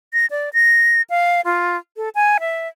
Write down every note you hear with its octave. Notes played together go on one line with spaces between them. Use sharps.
A#6
D5
A#6
F5
F4
A4
G#5
E5